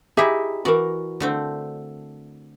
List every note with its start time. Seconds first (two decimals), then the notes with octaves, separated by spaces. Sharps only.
0.17 D#4 E4 G4 G#4 E5
0.65 E3 F#4 A#4 D5
1.20 D3 A3 C4